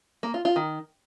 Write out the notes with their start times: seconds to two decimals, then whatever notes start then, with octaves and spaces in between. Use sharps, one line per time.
0.23 A#3
0.34 F4
0.45 F4
0.56 D#3